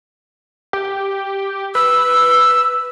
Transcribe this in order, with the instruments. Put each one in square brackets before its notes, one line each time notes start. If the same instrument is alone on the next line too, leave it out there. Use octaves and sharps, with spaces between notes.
[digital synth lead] G4
[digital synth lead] B4 [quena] E6